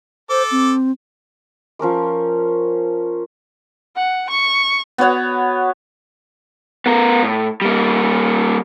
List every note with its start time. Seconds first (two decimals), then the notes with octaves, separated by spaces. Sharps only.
0.30 A4 C5 D6
0.51 C4
1.79 F3 C#4 A#4 D6
3.96 F#5
4.30 C#6
4.98 B3 F#4 C#5 F#5
6.86 B3 A#4
7.23 A2
7.62 G3 A#3